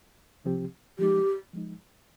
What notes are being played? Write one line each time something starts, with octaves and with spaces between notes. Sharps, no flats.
C2 C3 F3 C4 G4
F3 G#3 D#4 G4
F3 G#3 D#4